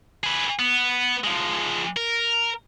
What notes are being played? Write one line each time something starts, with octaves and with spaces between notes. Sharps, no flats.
G#4 B4
B3
F3 G#3
A#4